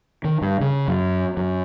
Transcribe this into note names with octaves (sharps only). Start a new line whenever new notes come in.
D#3
G2
C#3
F#2
F#2